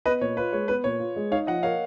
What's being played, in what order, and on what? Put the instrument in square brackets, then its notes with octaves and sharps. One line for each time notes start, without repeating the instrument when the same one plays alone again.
[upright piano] B3 [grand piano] B4 D#5
[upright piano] A#2 [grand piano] C#5
[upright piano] F4 [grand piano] B4
[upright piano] G#3 [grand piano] C#5
[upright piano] B3 [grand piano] B4
[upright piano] A#2 [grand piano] C#5
[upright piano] F4
G#3
[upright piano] D#4 [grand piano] C#5 F5
[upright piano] F3 [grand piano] D#5 F#5
[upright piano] A#4 [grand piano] C#5 F5